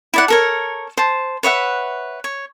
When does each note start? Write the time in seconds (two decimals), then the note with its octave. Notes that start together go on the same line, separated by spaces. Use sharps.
0.14 E4 D5 F#5
0.28 A4 A#4 C#5
0.97 C5 A5
1.43 B4 C#5 E5 F#5
2.24 C#5